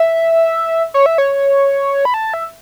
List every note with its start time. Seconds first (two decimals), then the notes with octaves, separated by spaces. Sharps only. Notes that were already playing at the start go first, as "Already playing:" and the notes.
Already playing: E5
0.94 C#5
1.06 E5
1.18 C#5
2.05 B5
2.14 A5
2.34 E5